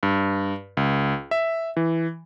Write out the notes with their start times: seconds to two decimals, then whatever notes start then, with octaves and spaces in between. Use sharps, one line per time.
0.03 G2
0.77 C#2
1.31 E5
1.77 E3